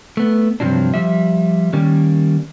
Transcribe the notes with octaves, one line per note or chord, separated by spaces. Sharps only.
A3 B3
G2 C3 F3 F#3 D4
F3 G3 E5
D#3 G3 A#3 C#4